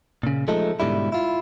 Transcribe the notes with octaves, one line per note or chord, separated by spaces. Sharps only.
A#2 C#3
F3 G#3 A3 D#4 A4
G#2 B2 D3 G3 E4
E4 F4